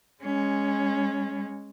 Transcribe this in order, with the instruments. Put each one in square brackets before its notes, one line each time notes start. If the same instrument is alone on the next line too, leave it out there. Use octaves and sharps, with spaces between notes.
[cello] G#3 C#4